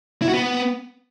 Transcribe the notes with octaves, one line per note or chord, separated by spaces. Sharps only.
E4
F#4
B3